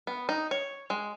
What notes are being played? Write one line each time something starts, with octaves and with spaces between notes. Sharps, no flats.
B3
D#4
C#5
G#3